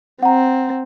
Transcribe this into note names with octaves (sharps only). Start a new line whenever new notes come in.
C4 F#5 A#5